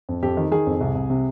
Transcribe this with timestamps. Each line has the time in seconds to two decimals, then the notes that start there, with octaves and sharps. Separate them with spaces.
0.09 F2
0.23 F2 G4
0.37 D#3
0.52 D#3 G#4
0.67 F2
0.81 C2
0.95 C2
1.10 C3